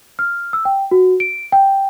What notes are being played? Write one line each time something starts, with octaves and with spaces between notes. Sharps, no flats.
F6
E6
G5
F#4
D7
G5